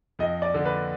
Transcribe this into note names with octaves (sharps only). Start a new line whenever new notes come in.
F2 D#5
D5
D3
B4